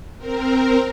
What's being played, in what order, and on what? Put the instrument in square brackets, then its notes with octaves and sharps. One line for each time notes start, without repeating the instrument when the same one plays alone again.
[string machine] C4 A#4